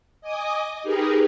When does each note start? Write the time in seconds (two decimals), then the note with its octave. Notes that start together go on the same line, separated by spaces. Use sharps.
0.21 D#5 G#5 D6 D#6
0.83 D#4 G4 G#4 A#4 B4